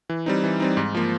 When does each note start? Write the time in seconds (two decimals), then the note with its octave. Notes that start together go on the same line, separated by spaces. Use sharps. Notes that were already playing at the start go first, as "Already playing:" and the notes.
0.09 E3
0.26 G3 C4 D#4
0.44 E3
0.60 G3 C4 D#4
0.77 G#2
0.95 F3 A#3